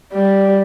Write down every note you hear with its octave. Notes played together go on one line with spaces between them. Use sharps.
G3